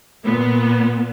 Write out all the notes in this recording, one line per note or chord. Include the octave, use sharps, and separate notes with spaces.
A#2 B3